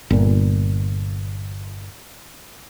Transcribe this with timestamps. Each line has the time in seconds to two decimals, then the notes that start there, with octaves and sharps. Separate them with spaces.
0.10 G1 A#2